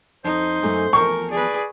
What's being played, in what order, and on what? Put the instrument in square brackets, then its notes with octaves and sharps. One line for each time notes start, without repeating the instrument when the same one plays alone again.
[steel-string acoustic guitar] F2 [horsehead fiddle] D#4 [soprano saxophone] C5
[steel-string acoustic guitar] F#2 A3 C#4
[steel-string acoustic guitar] E2 F3 [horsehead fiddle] A#4 [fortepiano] C#6
[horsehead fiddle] G#4 B4 [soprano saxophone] D5